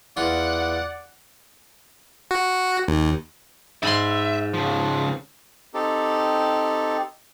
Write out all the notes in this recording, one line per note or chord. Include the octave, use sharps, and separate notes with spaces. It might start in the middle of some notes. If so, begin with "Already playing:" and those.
E2 F4 D5 F#5
F#4
D#2
G#2 E5 B5 C6
C#3 F3
C4 D#4 G4 A4